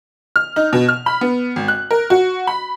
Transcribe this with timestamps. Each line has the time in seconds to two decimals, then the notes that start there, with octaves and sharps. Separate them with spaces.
0.36 F6
0.56 D#4
0.73 B2
0.89 F6
1.06 B5
1.21 B3
1.56 G#1
1.68 F#6
1.91 A#4
2.10 F#4
2.47 B5